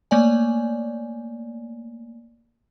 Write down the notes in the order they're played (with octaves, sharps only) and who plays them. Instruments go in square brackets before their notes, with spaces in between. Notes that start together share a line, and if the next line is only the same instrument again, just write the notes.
[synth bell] A3 A#3 C#5 D5 G#5